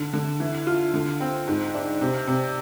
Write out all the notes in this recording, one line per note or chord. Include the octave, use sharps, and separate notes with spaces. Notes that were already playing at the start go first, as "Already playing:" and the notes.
Already playing: D3
D3
E3
F4
D3
C4
G#2
D4
C3
C3